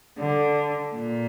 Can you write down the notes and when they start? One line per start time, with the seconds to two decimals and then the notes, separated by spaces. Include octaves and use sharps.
0.19 D3
0.94 A#2